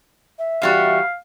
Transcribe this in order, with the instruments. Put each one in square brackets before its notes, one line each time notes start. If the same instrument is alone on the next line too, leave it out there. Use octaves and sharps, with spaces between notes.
[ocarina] E5
[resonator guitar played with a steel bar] E2 G3 F#4 [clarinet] F5